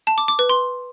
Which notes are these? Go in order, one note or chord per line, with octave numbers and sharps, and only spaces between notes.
A5
D6
D6
B4
C6